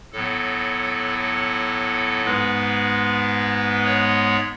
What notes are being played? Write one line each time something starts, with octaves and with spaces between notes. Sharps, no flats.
A2 F#3 B3 A4
A4
G#2 G#3 B3 B4
C#5